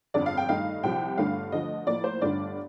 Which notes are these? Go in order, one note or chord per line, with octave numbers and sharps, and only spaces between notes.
G1 F2 D3 D5
F5
G5
G2 D#3 A3 D#4 F5
C2 C3 F3 G5
G1 G2 D3 A3 F5
D2 D3 F3 D#5
A2 F3 A#3 D5
C5
G1 G2 D3 A3 D4 D5